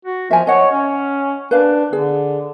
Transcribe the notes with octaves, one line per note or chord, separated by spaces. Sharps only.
F#4
F3 E5 G#5
C#5 D#5 F#5
C#4
D4 B4 F5
D3 G#4